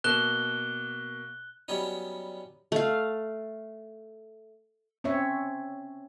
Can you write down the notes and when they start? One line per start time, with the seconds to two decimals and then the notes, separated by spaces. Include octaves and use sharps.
0.04 B2 A#3 F#6 E7 G7
1.68 F#3 G3 B3 C#4 D#4
2.72 A3 F5
5.04 C4 C#4 C#5 E5